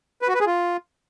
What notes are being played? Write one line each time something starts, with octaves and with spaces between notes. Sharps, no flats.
B4
F#4
B4
G#4
F4